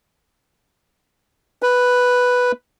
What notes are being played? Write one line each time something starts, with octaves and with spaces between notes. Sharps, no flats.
B4